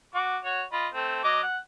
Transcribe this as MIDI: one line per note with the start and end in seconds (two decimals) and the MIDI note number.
0.14 0.37 66
0.14 0.37 86
0.45 0.63 66
0.45 0.63 73
0.73 0.88 65
0.73 0.88 75
0.73 0.88 83
0.93 1.24 57
0.93 1.24 60
1.24 1.41 54
1.24 1.41 75
1.24 1.41 86
1.43 1.58 78